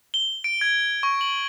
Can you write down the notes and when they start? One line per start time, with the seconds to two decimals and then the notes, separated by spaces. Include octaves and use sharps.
0.14 G7
0.44 D7
0.61 G#6
1.03 C#6
1.21 F#7